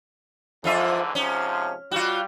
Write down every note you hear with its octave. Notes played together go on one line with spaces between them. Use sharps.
F2 G#2 D3 E3 F4 E5
G#2 C3 F3 C#4
G3 F4 F#4